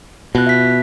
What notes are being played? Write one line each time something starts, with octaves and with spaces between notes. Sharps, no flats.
B2 F4 F#6
E5 B6